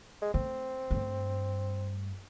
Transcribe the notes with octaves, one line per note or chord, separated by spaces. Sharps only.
G#3
A3 C4
G2 A3